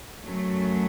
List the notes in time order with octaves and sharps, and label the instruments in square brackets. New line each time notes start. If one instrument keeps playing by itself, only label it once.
[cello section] F#2 F#3 A3